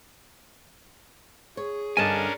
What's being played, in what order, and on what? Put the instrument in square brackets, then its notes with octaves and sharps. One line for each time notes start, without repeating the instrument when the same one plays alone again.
[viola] G#4 [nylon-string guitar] C#5
[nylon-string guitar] G2 D3 D#5 [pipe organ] C#4 D4 A#4 [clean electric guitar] G#5 A5